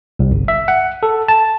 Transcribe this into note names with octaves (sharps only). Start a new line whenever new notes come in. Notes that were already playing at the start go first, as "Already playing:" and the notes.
C2
G1
E5
F#5
A4
A5